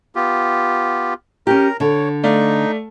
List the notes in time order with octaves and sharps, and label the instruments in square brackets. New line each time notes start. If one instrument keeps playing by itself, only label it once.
[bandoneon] B3 F4 G4
[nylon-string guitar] C#4 G4 [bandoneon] A#4 A#5
[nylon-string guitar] D3 [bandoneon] C#5
[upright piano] A3 D5 F5 [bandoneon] D#4